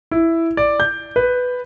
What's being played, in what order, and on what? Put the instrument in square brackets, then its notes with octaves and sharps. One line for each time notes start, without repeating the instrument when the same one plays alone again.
[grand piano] E4
D5
G6
B4